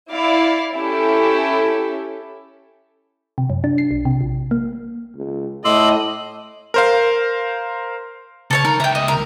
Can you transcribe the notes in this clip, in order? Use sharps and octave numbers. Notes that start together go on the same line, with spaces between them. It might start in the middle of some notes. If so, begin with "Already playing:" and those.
E4 D5 F5
C#4 E4 G4 A4
C3
F#2
D4
C7
B1
C3
A#1
A#3
C#2
A2 D#5 C6 D6 E6 F#7
A#4 C5 F5
C#3 A4 C#5 A5
D#4 A#4
C#2 E5 G5 A#5
D#5
A#4